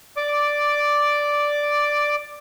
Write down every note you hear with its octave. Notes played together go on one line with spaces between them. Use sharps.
D5 D6